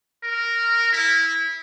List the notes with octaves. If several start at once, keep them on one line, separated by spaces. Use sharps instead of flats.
A#4
E4